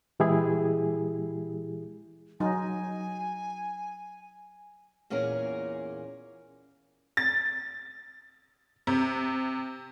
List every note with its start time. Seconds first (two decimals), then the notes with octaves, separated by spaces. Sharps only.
0.20 A#2 E3 G#3 E4 G4 G#4
2.40 F#3 D#4 G#5
5.10 E2 A#2 C#4 G#4 A#4 G#5
7.17 A6
8.87 C3